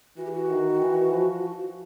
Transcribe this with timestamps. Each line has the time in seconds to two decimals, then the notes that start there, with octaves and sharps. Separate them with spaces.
0.17 E3 F#4
0.25 G4
0.32 F#4
0.49 D#3
0.81 E3
1.12 F3